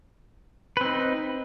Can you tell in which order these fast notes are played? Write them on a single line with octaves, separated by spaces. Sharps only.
B4 C4 D#4